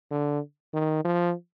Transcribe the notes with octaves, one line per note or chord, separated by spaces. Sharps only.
D3
D#3
F3